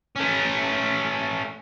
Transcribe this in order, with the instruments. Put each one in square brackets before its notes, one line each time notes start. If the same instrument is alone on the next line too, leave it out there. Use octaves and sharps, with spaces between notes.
[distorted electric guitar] A3 C#4